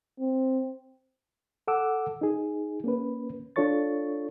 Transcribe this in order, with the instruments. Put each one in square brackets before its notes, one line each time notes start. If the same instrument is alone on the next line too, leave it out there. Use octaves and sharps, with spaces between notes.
[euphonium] C4
[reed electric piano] A4 F#5 D6 E6
D#4 G#4
A#3 C#4 B4
D4 F4 A4 C#5 C#6 A6